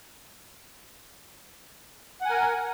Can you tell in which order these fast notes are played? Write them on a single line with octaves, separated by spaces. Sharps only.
F#5 G#5 A#4